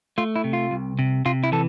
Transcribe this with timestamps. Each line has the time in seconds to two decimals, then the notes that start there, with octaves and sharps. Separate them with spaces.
0.18 A3 F4
0.36 E4
0.44 C3
0.53 F4
0.71 C2
0.99 C3
1.25 C3 F4
1.44 E4
1.52 E3 A4